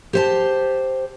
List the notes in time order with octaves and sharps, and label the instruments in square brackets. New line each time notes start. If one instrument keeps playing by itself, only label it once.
[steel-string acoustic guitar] G4 C5 A5